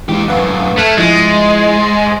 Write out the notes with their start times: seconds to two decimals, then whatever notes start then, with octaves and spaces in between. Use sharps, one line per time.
0.09 E3 G#3 D#4 G4
0.28 F#2 A2 B4 F5 F#5
0.78 A3 F6 F#6 G#6
0.98 F3 G#3 E4 C5 D#5 A6